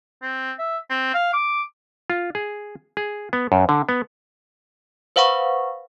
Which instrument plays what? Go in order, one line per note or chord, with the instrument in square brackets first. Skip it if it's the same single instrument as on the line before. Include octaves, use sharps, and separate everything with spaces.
[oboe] C4
E5
C4
F5
D6
[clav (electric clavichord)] F4
G#4
G#4
B3
F#2
D3
B3
[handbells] B4 C5 F5 F#5 B5 C#6